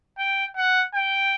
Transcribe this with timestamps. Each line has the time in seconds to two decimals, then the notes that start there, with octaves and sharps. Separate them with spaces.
0.18 G5
0.57 F#5
0.95 G5